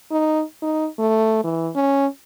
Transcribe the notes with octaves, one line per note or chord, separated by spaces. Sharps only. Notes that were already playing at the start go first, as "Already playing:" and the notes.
D#4
D#4
A3
E3
C#4